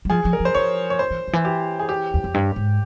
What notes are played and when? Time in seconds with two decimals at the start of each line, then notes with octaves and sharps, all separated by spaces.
0.05 G3
0.10 F3 G#4
0.25 F3
0.33 A#4
0.40 F3
0.45 C5
0.55 F3 C#5
0.90 C#5
0.99 C5
1.10 E3
1.28 C#3
1.33 E3
1.45 G4
1.79 G#4
1.89 G4
2.14 E2
2.24 F2
2.34 G2
2.56 G#2